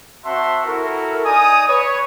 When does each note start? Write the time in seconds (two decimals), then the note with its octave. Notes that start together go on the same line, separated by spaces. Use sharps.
0.24 C4 F#4 E5 F#5 A5 C6
0.65 E4 F#4 A4 A#4
1.24 D#4 D5 G#5 A#5 D#6
1.68 B4 C#5